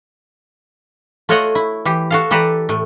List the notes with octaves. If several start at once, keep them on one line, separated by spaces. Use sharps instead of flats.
A3 F4 F#4 C#5 D#5 F#5
E4
E3 G4
F#4 A4 F5
E3 G4 A4 B4 D5 A#5
A2 A3